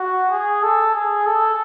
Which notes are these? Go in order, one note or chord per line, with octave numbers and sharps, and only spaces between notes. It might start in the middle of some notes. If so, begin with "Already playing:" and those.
Already playing: F#4
G#4
A4
G#4
A4